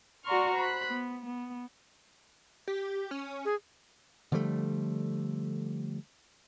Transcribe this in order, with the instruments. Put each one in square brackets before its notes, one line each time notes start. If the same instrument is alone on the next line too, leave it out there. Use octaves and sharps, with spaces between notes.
[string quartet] F#4 D5 A#5 C6 C#6 F6
C5 B5 F#6
B3
B3
[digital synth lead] G4
C#4
[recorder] G#4
[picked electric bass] D3 F3 G3 A3